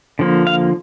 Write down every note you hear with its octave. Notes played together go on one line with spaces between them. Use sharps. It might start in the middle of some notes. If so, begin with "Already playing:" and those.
D3 F3 A#3
F5